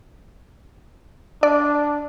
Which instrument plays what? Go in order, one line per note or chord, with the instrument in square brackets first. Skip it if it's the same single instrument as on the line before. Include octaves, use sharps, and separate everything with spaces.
[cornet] D4 [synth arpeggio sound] D5